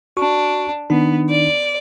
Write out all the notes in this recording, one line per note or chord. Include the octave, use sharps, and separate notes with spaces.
D4 F#4 C#6
D#3 B3 D4 D#4
D5